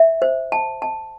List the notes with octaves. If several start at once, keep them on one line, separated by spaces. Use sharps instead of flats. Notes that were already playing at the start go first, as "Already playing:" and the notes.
Already playing: E5
C5
A5
A5